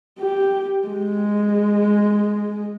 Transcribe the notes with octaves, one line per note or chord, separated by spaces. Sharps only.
G4
G#3